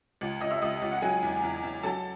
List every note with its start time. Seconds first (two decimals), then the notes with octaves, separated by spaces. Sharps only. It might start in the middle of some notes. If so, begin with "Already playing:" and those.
0.21 C#2
0.41 C#2 D#5 D#6
0.51 E5 E6
0.62 C#2 D#5 D#6
0.82 C#2
0.91 F#5
1.02 F#3 G#4 G#5
1.23 E2
1.43 E2
1.63 E2
1.83 F#3 A4 A5